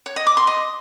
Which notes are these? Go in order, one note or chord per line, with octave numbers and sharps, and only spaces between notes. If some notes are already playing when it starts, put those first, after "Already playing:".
C#5
D#5
D6
C6
D#5